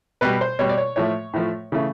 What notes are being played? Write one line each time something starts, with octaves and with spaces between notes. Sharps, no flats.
B2 G3 B4
C5
B2 G3 C#5
D5
C#5
A2 F3 A3 C#5
A2 F3 A3
C#3 E3 A3